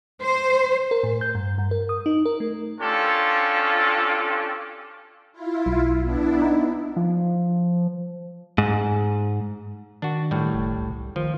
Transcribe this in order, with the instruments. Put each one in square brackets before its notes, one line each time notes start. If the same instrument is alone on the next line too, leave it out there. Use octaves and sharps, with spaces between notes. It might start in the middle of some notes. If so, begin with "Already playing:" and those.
[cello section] C5
[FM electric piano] A#4
A2
G6
G2
G2
A#4
D#6
D#4
A#4
A3
[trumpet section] C#4 D4 F4 G4 A4
[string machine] E4 F4
[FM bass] B1
[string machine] B3 D4 E4
[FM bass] D#4
[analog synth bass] F3
[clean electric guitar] G#2
[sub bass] D#3 [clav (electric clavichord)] D4 F#4
[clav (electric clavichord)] A2 G3
[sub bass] F#1
C2
[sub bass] D#3 [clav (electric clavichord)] F3